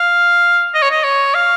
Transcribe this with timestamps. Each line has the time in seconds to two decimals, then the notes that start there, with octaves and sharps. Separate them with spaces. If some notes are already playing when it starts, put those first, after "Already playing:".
Already playing: F5
0.74 D#5
0.82 C#5
0.91 D#5
1.04 C#5
1.34 F5